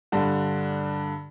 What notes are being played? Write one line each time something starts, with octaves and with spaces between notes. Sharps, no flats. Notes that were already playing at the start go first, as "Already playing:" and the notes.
G2 D3